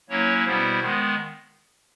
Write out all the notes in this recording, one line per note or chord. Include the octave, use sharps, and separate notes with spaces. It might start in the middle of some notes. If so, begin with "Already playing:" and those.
F#3 A#3 C#4 E4 C#5
B2 G3 B3 E4 C5
D#3 G#3 B3